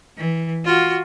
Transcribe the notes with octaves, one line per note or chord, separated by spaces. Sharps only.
E3
F4 F#4